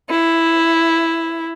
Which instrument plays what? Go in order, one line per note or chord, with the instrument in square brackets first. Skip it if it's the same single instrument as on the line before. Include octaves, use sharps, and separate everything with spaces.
[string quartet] E4